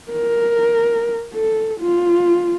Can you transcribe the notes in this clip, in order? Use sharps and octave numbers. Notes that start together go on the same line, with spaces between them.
A#4
A4
F4